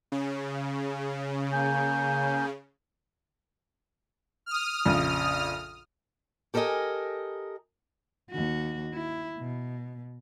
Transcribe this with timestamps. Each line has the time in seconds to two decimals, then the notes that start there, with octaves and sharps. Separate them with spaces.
0.12 C#3
1.53 A#3 G#5 G6
4.46 D#6 F6
4.86 A#1 F2 C#3
6.54 G4 A4 A#4 C5 D#5 G#5
8.30 D#2 F#4
8.93 E4
9.39 B2